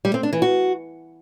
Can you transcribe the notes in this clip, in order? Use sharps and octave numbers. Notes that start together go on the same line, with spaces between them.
G3
C4
D4
E3
F#4